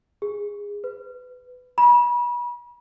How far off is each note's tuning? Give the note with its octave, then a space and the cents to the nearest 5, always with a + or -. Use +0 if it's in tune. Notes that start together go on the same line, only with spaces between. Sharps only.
G#4 -20
B4 +20
B5 -35